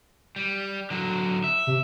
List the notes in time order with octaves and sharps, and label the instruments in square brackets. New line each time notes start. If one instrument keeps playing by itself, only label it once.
[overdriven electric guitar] G3
D3 F#3
E5
[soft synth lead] C3